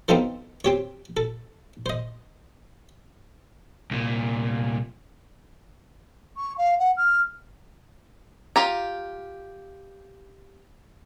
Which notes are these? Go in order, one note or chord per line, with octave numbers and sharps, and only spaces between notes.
B3 C4 D#4 F4 A4 C5
C4 G4 C#5
A4
C5 D#5
C2 A#2
C#6
F5
F#5
F6
F4 G4 A#5